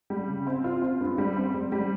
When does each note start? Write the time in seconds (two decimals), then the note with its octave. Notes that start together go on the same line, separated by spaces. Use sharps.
0.10 G3
0.28 C#3
0.47 C4
0.64 F4
0.82 C4
1.01 G2
1.18 G3
1.37 C4
1.54 G3
1.72 G3